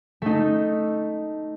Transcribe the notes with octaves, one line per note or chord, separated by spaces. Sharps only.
A3 D#4